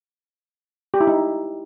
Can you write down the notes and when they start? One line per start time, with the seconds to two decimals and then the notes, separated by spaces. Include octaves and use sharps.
0.94 G4
1.01 E4
1.07 D#4